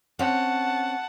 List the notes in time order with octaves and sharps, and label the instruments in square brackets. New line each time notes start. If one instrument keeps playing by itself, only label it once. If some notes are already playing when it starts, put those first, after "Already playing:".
[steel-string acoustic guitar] C4 C#4 C#5 [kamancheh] F#5 A5